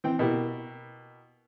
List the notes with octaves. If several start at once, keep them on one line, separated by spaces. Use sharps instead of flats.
E3 C4 G5
B2 A#3 E4 G4